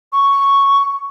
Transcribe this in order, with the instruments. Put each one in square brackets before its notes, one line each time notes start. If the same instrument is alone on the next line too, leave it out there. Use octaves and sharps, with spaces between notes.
[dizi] C#6